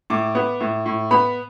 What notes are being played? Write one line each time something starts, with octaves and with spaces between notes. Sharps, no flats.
A2 D6
B3
A2
A2
B3 B5